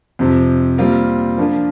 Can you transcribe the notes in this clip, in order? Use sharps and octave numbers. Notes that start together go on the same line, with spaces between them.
F2 C3 F3
A#2 G3 C4 F4 A#4
F3 A#3 D4 F4 A#4